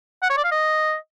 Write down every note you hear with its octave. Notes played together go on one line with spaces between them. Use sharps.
F#5
C#5
D5
F5
D#5